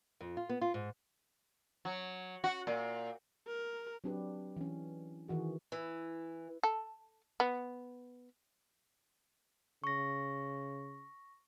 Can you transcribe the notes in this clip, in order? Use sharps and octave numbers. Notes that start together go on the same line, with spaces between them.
F2
F4
B3
F4
G#2
F#3
F#4
A#2
A#4
F#3 C4 D4 G4 B4
E3 C#4
D#3 E3 F#4 G#4
E3
A4
B3
C#3 C#6 A#6